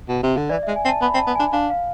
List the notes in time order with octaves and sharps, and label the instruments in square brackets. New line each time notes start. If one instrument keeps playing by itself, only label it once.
[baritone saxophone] B2
C3
D3
[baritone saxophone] E3 [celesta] D5
[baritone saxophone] G#3 [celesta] E5
[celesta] G#5
[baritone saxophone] C4
[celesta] A5
[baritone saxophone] B3 [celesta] B5
[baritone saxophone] C4
[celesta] A5
[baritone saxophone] B3
[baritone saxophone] D4 [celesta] G#5
[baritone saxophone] D4 [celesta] F5
[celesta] F5